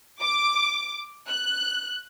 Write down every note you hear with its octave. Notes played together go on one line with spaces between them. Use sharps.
D6
F#6